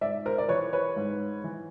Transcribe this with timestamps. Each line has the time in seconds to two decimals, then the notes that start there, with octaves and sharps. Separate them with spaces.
0.01 G#2 D5 E5
0.25 A#4 C5
0.38 D5
0.48 E3 B4 C#5
0.73 B4 C#5
0.96 G#2
1.44 E3